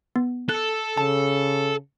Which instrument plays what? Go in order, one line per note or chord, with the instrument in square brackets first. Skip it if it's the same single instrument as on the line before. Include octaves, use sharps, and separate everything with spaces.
[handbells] B3
[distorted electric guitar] A4 [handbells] F#6
[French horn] C#3 [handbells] A5